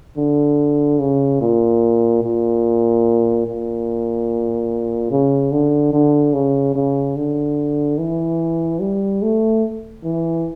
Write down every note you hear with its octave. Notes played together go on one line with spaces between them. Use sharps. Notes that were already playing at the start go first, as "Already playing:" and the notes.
D3
C#3
A#2
A#2
A#2
C#3
D3
D3
C#3
C#3
D3
E3
G3
A3
E3